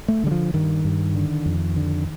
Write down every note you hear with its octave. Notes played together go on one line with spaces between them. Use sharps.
A3
D3 G3
F3
G2 D#3
G2
D3
F2
D3